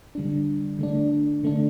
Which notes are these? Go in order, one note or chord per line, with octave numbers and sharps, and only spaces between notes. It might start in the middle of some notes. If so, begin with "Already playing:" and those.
D3 G3 D4
D3 A3 D4
D3 A3 D4